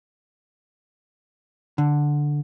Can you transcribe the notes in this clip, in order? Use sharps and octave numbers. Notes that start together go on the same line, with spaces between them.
D3